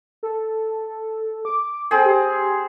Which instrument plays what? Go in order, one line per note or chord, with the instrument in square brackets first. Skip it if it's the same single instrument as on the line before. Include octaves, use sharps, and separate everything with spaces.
[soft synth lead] A4
D6
[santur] C4 G#4 [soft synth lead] A4
[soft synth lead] G4